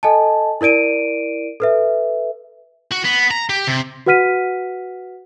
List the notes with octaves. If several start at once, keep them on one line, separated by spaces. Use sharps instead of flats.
A4 D#5 G#5 A5
E4 A#4 D5 D7 D#7
A4 B4 E5
F#4
B3
A#5
G4
C3
F#4 B4 F#5 F6 B6 D#7